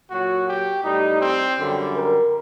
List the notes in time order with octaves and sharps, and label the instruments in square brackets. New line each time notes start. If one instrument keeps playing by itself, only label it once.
[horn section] A#2 F#3 F#4
G4
A2 G3 D#4
C4
F#2 D3 G3
A#4